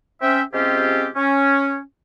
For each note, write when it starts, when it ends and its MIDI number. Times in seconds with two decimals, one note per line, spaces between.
0.22 0.41 60
0.22 0.41 61
0.22 0.41 76
0.22 0.41 79
0.53 1.08 48
0.53 1.08 56
0.53 1.08 60
0.53 1.08 61
0.53 1.08 65
0.53 1.08 67
1.15 1.79 61